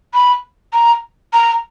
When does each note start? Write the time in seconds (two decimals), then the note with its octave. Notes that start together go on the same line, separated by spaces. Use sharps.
0.14 B5
0.73 A#5
1.33 A#5